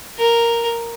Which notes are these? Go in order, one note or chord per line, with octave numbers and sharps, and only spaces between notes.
A#4